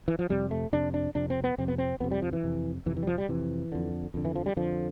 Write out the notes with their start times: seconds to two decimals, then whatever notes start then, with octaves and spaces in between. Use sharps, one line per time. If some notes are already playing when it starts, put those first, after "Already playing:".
0.08 E3
0.19 F3
0.29 F2 C3 G3
0.51 A3
0.73 F2 C3 D4
0.94 D4
1.15 F2 C3 D4
1.30 C4
1.44 B3
1.58 F2 C3 C4
1.68 B3
1.78 C4
2.00 F2 C3 B3
2.11 G3
2.22 F3
2.33 E3
2.43 F2 C3
2.86 F2 C3 E3
2.97 E3
3.03 G3
3.07 F3
3.18 G3
3.28 F2 C3 E3
3.72 F2 D3
4.14 F2 D3
4.25 E3
4.36 F3
4.46 G3
4.56 F2 D3 F3